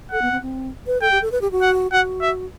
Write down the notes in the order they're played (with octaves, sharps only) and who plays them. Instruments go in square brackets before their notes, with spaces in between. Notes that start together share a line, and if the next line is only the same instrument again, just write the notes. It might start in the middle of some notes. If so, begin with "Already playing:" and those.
[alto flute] A4 [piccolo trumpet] F#5
[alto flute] B3
C4
C4
B4
[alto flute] A4 [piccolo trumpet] G5
[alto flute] G4
A4
B4
G4
F#4
[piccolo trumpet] F#5
[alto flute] F#4 [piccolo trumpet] F#5
[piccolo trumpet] E5